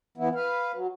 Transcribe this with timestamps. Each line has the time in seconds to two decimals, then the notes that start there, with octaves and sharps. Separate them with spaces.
0.17 E3 B3 E4
0.35 B4 F5
0.74 F#3